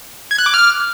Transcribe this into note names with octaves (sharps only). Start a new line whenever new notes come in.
G#6
F#6
D6
F6